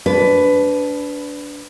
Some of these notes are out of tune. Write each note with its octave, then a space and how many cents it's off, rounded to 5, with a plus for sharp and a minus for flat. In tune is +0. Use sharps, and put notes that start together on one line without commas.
D4 -20 B4 +15